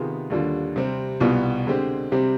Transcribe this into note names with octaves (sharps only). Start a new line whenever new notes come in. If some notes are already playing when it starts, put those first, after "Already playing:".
Already playing: C3 D#3 B3 F4 G#4
D#2 D3 G3 D4 F4
C3 G3 C4
C2 B2 G3 B3 F4
D3 G#3 C4 G4
C3 G3 C4 G4